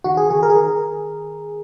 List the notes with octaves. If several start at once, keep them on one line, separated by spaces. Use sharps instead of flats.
D#3 F#4
G#4
D#3 G#4
A#4
G#4
D#3 A#4